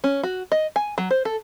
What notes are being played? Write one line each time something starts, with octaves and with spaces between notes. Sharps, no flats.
C#4
F#4
D#5
G#5
F#3
C5
A4